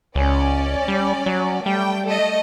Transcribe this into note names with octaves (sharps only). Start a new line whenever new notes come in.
C#2 C#4 D5
G3
F#3
G3 A3 G5
A3 A4 D#5